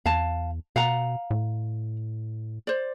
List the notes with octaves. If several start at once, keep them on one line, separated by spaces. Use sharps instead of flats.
E2 F5 A5
B2 F5 F#5 A#5
A2
C5 D5